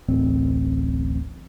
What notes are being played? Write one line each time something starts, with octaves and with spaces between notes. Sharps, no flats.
D1 A1 C4